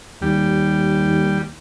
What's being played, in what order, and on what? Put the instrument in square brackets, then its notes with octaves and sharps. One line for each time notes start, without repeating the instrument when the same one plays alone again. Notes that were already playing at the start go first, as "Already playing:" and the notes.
[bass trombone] D#2 [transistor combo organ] G3